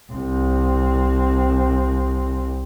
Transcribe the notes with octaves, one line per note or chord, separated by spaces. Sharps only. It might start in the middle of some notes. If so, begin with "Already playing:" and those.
C2 C4